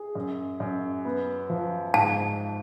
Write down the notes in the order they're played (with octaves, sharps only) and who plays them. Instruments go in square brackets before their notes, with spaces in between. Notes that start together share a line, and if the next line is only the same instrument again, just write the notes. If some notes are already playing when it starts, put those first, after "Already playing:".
Already playing: [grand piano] G#4
F#2
F#2
B3
F3
[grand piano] G#2 [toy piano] A5